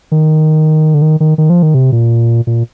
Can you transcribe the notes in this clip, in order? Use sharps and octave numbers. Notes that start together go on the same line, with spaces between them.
D#3
D3
D#3
D#3
D#3
F3
D#3
C3
A#2
A#2